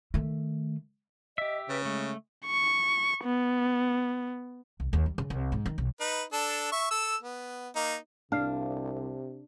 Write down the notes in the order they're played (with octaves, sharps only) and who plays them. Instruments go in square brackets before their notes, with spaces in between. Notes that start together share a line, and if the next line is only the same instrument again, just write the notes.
[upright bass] D#3 A3
[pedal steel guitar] G4 E5 [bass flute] D#5
[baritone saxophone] C#3 [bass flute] B4
[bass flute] G#3 [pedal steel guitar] A3
[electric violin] C#6
B3
[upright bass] C2
D#2
G3
C#3
C2
G#2
D#3
B1
[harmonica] D#4 B4
D4 A4
E5 C#6
A4 E6
B3
A#3 D#4
[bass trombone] C2 [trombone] C3 [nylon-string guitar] D4 [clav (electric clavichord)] F5